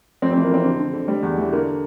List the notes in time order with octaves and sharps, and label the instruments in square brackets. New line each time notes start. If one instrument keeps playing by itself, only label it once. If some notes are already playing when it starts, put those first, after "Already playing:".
[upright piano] F2 C4
C4
E3
A#3
F2 C4
D3
D3
D3
G3
E2
E3
D3 A#3